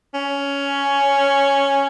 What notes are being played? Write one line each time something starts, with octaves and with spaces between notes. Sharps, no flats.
C#4